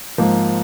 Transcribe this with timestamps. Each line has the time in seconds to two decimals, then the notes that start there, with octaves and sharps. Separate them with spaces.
0.18 G#2 F3 A#3